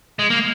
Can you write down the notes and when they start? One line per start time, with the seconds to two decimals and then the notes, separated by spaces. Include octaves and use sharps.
0.19 G#3
0.30 A#3